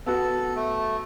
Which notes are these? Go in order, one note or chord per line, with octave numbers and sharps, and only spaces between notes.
B3 F#4 A4
A3